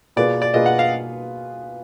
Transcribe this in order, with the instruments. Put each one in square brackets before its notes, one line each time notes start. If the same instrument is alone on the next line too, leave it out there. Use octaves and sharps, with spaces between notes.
[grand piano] B2 A#3 F4 G#4 B4 [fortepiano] D5
[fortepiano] D5
[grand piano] B2 A#3 F4 G#4 B4 [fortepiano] D#5
[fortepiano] F#5
F5